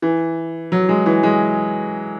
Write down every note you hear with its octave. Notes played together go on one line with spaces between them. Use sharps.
E3
F#3
G#3
E3
G#3